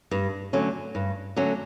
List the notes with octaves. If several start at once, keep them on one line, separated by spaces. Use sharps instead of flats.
G2
D3 F#3 A3 C#4
G2
D3 F#3 A3 C#4